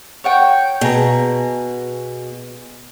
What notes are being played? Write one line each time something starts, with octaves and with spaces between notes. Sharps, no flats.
C#5 F#5 G5
B2 G#4 A5 A#5